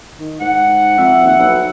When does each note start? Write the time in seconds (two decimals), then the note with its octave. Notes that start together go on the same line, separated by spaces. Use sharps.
0.20 D#3
0.41 G#2 F#5
0.98 F2 E5
1.24 D#2
1.39 B1